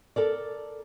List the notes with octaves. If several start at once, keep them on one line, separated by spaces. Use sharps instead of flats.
A4 A#4 D5